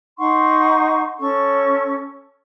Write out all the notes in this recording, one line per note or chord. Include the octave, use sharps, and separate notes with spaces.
D#4 F#5 C6 C#6
C#4 A4 C#6